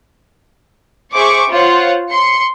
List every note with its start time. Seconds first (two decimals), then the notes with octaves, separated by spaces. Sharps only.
1.13 G#4 C5 E5 C#6 D6
1.50 F4 C5 C#5 F#5
2.11 C6 C#7